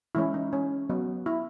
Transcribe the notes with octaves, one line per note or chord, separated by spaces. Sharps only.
E3 G#3 C#4 E4
D#4
C#4
F#3 B3
E4